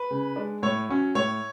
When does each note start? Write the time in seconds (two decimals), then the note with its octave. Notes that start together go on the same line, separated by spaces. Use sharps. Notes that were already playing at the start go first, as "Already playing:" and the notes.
Already playing: B4
0.11 C#3
0.36 G#3 D4
0.62 A2 C#5
0.89 F#3 C#4
1.15 A2 C#5